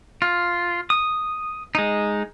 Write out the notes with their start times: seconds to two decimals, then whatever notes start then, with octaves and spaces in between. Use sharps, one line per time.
0.22 F4
0.90 D#6
1.75 G#3 D#4